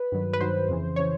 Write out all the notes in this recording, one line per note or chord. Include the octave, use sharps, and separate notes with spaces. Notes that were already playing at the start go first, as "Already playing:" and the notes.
Already playing: B4
G2 D#3 F#3
B4
G2 D#3 F#3 C5
F2 C#3 E3
C#3 E3 C#5